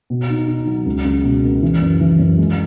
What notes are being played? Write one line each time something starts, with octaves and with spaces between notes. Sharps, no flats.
B2
D#4
D#4
F#3
C#2
C#2
B2
A#3
E3
F#2
E3
F#2
G#3